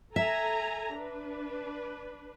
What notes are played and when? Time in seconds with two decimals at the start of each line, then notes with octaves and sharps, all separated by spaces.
0.16 A4 E5 G#5 A#5
0.93 D4 B4